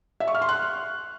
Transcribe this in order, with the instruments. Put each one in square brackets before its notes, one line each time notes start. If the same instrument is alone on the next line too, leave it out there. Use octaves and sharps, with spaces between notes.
[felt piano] E5
C#6
F6
C6
F#6